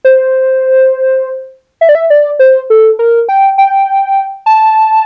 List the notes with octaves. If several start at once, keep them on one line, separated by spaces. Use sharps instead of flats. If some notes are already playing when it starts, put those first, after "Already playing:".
C5
E5
D5
E5
D5
C5
A4
A#4
G5
G5
A5